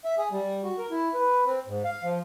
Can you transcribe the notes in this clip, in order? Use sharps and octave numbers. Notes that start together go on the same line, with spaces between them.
E5
G#4
G3
F#4
A#4
E4
B4
C4
G#2
F5
F3